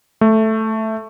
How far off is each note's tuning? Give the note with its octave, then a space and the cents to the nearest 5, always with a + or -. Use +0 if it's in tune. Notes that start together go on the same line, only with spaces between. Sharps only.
A3 +0